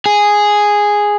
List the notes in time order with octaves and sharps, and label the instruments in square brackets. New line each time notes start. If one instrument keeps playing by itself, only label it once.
[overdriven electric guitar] G#4